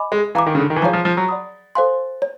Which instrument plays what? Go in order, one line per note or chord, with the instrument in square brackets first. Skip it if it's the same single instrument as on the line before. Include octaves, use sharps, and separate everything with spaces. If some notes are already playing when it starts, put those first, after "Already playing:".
Already playing: [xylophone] D#5 G#5 B5 D6
[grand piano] G#3
[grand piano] E3 [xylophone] F5 A#5 D6
[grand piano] D#3
C#3
D3
D#3
E3
[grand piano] F3 [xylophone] G#4 C#5 F5 A#5 C#6
[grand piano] F3
F3
F#3
[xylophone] D5 F#5 B5 D#6
A4 C5 F5 G#5 C6
C#5